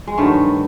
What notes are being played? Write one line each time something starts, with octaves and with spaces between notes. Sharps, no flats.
G#3
G2 D#3 F#3 A3